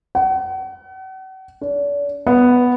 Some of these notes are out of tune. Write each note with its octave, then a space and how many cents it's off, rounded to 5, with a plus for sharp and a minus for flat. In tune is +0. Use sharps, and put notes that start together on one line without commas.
F#5 +40
D4 -40
B3 +0